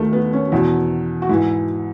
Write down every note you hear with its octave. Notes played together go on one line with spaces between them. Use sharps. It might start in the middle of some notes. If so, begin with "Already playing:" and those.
Already playing: D#2 D#3 A3
B3
C#4
E2 B2 E4
F#4
G#2 E3 E4